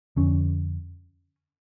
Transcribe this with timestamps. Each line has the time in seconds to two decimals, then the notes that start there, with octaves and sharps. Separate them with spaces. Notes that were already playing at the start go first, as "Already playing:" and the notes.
0.16 F2 D3 C#4